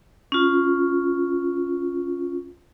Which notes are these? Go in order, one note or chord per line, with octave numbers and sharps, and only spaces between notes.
C#4 F4